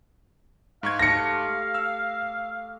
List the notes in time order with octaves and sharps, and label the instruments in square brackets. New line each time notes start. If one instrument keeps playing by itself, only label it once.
[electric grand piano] G#2 C#6 G#6 [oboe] F5
[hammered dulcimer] A3 G4 [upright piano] A#6 C#7
[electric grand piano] E6 F6